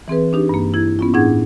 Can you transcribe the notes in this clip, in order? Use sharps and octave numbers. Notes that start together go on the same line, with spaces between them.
E3 C4 G#4 B4
D4 D#4 G4
G2 A#3
E4 G#6
B3 C#4 F4
A2 D4 E4 G#4 F#5 G#6